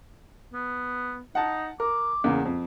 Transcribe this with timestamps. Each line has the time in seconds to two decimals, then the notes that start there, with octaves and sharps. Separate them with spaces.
0.53 B3
1.35 D#4 F#5 A5
1.80 A#4 D6
2.24 E2 C#3 A#3
2.45 F2